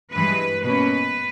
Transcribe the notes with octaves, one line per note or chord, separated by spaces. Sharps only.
G2 E3 G#3 B4
B2 A#3 C#4 B4